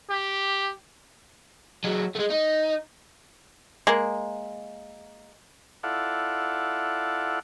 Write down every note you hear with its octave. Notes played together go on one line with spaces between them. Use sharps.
G4
F#3 G#3
G#3 A3
D#4
G#3 A#3
E4 F4 A4 D5 F#5